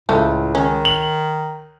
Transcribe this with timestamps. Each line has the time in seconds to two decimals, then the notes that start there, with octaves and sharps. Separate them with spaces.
0.09 C#2 A2 F3 A3 A4
0.55 D#3 C#4
0.85 F#7